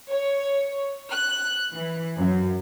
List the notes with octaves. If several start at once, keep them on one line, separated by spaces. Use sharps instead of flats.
C#5
F#6
E3
F#2